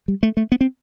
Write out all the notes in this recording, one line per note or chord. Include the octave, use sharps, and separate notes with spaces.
G3
A3
A3
B3
C4